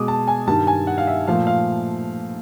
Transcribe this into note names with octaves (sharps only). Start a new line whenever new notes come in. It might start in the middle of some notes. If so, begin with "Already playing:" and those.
Already playing: B2 G#3 D6 D#6
A5
G#5
G2 D#3 G3 A5
G#5
F#5
F5
E5
A#2 F3 A3 F5
F5